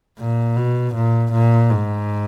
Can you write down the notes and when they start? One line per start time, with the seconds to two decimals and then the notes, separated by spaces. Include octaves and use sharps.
0.19 A#2
0.57 B2
0.95 A#2
1.33 A#2
1.71 G#2